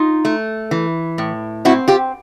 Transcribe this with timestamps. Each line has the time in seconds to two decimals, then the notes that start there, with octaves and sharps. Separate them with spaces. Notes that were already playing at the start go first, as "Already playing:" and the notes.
Already playing: D#4 F4
0.25 A3
0.71 E3
1.18 A2
1.65 C4 E4 F#4
1.88 F4 G4